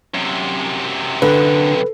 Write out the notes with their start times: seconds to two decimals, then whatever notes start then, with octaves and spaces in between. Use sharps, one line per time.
0.14 F#2 C3
1.22 D3 B4